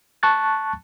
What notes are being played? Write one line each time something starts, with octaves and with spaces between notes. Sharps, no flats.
A5 C#6 F#6 A6